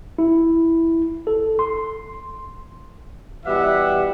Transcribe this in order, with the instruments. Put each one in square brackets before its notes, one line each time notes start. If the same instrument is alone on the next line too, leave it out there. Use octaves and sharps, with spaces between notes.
[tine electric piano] E4
A4
C6
[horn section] B2 E3 G3 G4 E5 F#5